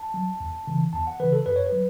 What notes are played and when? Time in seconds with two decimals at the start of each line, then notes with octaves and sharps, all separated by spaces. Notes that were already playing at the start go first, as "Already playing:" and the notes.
Already playing: A5
0.14 F#3
0.40 E2
0.67 C#3 E3
0.93 E2 A5
1.07 F#5
1.20 C#3 E3 B4
1.33 A4
1.46 F#2 B4
1.56 C#5
1.67 B4
1.72 F#3